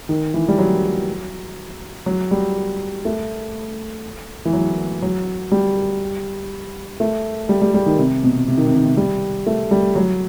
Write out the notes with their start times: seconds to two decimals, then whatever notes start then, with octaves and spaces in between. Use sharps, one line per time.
0.09 D#3
0.34 E3
0.48 G3
0.58 F#3
2.06 F#3
2.31 G3
3.05 A3
4.45 E3
4.53 F#3
5.02 F#3
5.52 G3
7.00 A3
7.49 G3
7.62 G3
7.74 G3
7.86 D#3
7.98 C3
8.23 B2
8.48 C3
8.57 D#3
8.67 C3
8.76 D#3
8.85 C3
8.97 G3
9.47 A3
9.71 G3
9.96 F#3